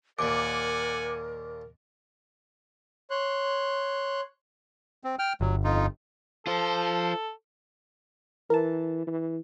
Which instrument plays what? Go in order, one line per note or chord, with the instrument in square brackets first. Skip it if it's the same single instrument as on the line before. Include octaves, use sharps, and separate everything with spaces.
[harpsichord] D#2 A#2 [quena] A#4 [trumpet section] D5 F#5 G#5 [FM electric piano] D6
[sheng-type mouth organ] C#5 C6 F#6
[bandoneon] C4
G5 F6
[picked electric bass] G1 [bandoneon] F#3
[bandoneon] F2 D#4 F4
[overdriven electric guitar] F4 C5 [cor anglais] A4
[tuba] E3 [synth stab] A#4 A5
[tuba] E3